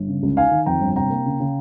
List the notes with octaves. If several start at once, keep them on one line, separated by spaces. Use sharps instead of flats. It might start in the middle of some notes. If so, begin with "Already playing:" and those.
Already playing: G1
C#3
C#2
D#4 F5 G#5
D#3
F2 G5 A#5
G1
C3 G5 A#5
A#3
C#3
C#3